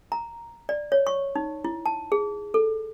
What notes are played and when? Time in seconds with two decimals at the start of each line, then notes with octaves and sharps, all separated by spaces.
0.12 A#5
0.69 D5
0.92 C#5
1.07 C#6
1.35 D#4
1.65 E4
1.86 A5
2.12 G#4
2.54 A4